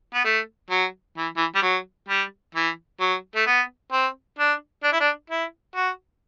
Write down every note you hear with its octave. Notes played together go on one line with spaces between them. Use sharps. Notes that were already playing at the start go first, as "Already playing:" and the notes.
B3
A3
F#3
E3
E3
G3
F#3
G3
E3
F#3
A3
B3
C4
D4
D4
E4
D4
E4
F#4